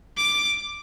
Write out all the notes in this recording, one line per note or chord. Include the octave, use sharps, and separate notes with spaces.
D6